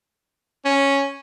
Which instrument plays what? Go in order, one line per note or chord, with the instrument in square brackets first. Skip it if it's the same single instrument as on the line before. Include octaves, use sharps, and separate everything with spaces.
[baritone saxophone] C#4